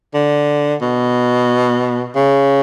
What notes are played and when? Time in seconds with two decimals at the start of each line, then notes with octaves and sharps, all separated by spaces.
0.14 D3
0.82 B2
2.16 C#3